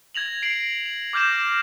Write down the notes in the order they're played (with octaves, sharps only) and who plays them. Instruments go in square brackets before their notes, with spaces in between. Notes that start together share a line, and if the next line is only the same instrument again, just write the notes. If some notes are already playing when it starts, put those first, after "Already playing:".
[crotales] G#6 A#6 F7 F#7
C7 D7 F#7
F7
D6 F6 G6 A#6 E7